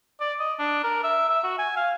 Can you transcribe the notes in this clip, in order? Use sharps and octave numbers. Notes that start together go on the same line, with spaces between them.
D5
D#5
D4
A#4
E5
E5
F#4
G#5
F5